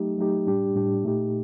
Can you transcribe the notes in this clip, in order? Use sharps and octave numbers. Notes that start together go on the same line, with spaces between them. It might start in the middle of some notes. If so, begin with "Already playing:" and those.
Already playing: F#3 A3 D#4 G4
F#3 A3 D#4 G4
A2 G3 D4 G4
A2 G3 D4 G4
A#2 A3 D#4 G4